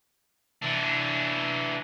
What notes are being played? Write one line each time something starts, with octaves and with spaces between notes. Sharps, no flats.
E3 D4